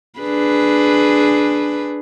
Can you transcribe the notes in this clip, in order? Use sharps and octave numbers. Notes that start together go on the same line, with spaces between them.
D4 G#4 B4